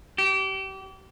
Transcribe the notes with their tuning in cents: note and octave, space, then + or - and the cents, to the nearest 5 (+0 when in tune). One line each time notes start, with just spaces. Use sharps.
G4 -30